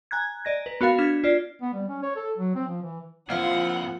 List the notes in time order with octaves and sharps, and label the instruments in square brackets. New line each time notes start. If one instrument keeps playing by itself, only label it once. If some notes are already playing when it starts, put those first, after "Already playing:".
[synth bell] G#5 A#5 F#6 G#6
D5 D#5 A#6
B4
B3 F#4 A#4 F5 A6
D4 F6 G#6 B6 E7
F4 D5
[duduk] B3
G3
C#4
C#5
A4
F#3
C4
F3
E3
[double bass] F3 [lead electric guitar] A#3 C4 [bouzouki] E4 F5 [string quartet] F#5